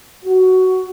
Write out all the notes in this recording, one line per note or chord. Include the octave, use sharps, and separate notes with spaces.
F#4